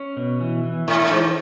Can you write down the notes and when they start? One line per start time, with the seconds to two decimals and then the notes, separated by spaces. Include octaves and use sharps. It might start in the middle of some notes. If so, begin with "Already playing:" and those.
Already playing: C#4
0.17 B2
0.40 E3
0.64 E3
0.87 A2 E4
1.02 A2
1.11 G#2 E3